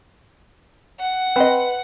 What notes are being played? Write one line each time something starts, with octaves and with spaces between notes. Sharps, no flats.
F#5
C4 B4 D#5